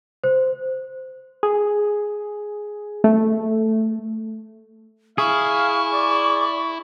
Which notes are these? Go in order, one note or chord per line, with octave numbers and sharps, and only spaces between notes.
C5
G#4
A3
E4 G#4 F5 C#6
D5